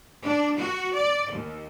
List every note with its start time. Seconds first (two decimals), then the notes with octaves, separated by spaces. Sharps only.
0.22 D4
0.57 F#4
0.93 D5
1.31 D#2